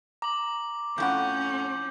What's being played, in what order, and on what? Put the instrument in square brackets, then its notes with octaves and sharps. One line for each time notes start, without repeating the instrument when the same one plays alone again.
[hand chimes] A#5 [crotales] D6 F#7
[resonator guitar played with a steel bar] F2 A2 F#5 [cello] C#4 [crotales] G6